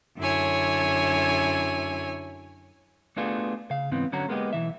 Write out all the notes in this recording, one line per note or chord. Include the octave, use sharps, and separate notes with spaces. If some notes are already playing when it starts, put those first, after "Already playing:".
F#2 D3 E4 C#5 G#5
A3 B3 D4 F4 F#4 G#4
C#3 F5
G#2 C#3 E3 B3 C4
D3 F#3 C#4 F#4 A#5
G#3 A#3 B3 C#4 D#4 G4
B1 E3 E5